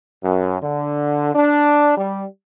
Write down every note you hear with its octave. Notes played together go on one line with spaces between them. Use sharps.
F#2
D3
D4
G3